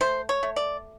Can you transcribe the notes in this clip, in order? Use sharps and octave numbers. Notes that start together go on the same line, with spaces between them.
A3 C5
C#5
A3
D5